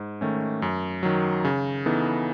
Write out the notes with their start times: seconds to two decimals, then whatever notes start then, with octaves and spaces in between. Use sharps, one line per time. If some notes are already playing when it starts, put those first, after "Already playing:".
Already playing: G#2
0.21 D#3 A3 C#4
0.62 F#2
1.03 D#3 F#3
1.44 C#3
1.86 E3 B3 D#4 A4